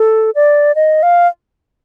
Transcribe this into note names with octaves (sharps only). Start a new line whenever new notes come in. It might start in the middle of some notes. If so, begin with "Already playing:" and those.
Already playing: A4
D5
D#5
F5